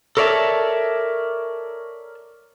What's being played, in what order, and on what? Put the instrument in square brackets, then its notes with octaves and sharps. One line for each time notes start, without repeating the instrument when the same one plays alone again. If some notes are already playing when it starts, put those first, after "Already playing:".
[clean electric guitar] A4 A#4 C#5 D5 E5 A5